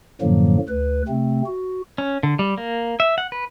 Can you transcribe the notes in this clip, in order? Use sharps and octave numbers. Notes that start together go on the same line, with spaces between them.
F#2 A2 D3 F3 F#3 A#3
D2 B4
C3 A3 C4
F#4
C#4
D3
G3
A#3
E5
F#5
B4